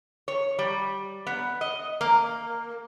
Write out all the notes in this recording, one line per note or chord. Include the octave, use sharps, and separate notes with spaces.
C#5
G3
B3
D#5
A#3